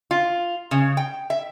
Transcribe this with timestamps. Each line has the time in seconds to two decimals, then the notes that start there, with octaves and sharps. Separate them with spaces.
0.11 F4
0.71 C#3
0.97 G5
1.30 E5